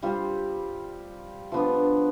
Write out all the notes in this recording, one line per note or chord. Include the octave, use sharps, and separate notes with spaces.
G3 C4 F4
F3 B3 D4